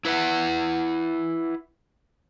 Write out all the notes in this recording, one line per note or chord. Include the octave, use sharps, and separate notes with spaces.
E4 B4 E5 F#5